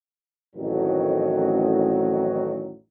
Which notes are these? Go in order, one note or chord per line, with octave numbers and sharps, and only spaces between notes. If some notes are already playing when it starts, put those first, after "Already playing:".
A1 F2 D#3 F#3